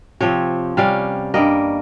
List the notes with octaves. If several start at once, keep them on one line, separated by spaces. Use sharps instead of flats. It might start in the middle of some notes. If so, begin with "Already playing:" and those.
C3 F3 C4 C#5
C3 G3 C#4 F5
G2 G3 A#3 D#5